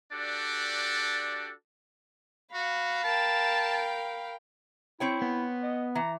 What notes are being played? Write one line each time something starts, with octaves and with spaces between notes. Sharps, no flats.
D4 F#4 G4 A4 D5
F#4 F5 B5
A#4 G5 A5
C4 E4 C#5 G5
B3
D#5
E3 A#5